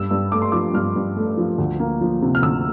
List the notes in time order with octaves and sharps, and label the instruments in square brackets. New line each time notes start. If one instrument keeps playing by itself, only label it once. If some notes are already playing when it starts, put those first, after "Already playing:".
Already playing: [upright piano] G2 E6
G2
A3 D6
C6
F3 D6
G2 F6
G2
A3
F3
D2
A#3
F3
C3
F6
D2 E6